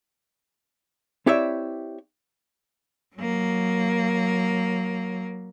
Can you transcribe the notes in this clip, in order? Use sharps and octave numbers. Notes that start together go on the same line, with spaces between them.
C4 E4 G4 C#5 D5 E5
F#3 A#3